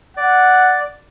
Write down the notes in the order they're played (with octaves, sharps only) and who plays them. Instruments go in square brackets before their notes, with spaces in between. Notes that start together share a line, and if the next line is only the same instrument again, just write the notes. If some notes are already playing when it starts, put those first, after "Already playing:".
[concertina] D5 [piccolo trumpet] F#5